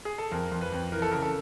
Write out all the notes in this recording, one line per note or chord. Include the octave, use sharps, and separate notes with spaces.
G#4
A4
F2 A#4
F2
B4
F2
E3 A#4
A4
C#3 A#4
A4